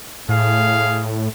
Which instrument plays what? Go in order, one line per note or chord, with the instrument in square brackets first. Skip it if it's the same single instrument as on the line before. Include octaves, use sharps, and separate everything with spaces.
[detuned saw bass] A2 [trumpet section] G#4 F5